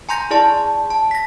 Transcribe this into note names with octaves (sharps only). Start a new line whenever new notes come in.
G#5 A#5 C6 G6 A#6
E4 G#4 D5 A5 C6
A5
A#6 B6